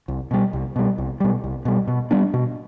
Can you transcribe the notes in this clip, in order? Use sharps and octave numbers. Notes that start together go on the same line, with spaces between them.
C2
B2 G3
C2
B2 G3
C2
B2 G3
C2
B2 G3
B2
G3 B3 D4
B2